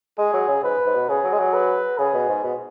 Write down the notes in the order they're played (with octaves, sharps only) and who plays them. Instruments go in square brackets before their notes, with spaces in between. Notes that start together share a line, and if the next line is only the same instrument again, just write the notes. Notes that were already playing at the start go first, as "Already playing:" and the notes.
[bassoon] G#3 [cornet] G#4
[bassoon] F#3
C#3
[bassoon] G#2 [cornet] B4
[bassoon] G#2
B2
[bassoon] C#3 [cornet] G#4
[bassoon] F#3
G#3
F#3
[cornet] B4
[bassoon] C#3 [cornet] G#4
[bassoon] B2
G#2
B2